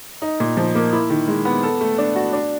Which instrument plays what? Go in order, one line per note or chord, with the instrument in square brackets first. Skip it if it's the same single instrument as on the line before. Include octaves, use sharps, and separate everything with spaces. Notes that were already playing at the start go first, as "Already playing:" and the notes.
[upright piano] D#4
A#2
F3
A#3
E4
D#3
G#3
B3
A4
A3
D4
F#4
D4